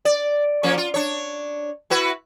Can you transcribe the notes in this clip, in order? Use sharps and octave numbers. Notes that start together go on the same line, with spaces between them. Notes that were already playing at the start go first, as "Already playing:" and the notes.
D5
F3 A#3 C#4
F4
D4 C#5
E4 F#4 B4